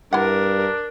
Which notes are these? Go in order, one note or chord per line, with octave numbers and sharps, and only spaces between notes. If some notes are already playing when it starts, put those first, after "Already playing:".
G2 D4 E4 A#4 F#5